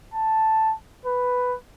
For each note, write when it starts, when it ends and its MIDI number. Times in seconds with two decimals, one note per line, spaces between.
0.14 0.74 81
1.05 1.55 71